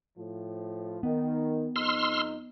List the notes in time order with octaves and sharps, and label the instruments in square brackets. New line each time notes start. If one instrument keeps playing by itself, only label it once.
[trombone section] A2 F3
[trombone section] D#3 [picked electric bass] B3
[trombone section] F2 D#4 [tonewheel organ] C6 E6 F6